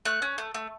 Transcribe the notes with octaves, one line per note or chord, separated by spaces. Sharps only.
A3 F#6
C#4
A3
A3